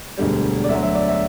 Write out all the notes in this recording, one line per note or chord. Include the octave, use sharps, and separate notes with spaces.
E1 D2 D3 G3
D5
D2 D3 F#3 E5
E5
D5
E5